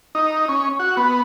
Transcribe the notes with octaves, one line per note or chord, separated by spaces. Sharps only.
D#4
C#4
F#4
B3